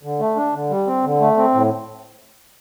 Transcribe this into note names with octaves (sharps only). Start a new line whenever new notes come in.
D3
A3
D4
D3
G3
C4
D3
A3
C4
A2